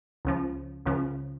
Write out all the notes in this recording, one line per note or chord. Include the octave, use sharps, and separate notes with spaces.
C#2 C#3 F3
C#2 C#3 F3